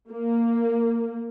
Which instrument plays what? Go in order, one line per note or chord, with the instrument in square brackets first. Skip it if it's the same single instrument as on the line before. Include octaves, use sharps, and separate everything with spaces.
[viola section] A#3